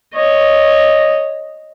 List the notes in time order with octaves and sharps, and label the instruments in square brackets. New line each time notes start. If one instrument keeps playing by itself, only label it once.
[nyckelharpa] C#5 D#5